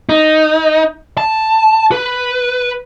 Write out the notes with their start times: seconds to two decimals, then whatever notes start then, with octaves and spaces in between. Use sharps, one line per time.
0.09 D#4
1.17 A5
1.92 B4